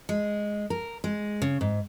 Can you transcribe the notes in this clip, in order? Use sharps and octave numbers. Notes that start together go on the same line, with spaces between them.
G#3
A#4
G#3
C#3
G#2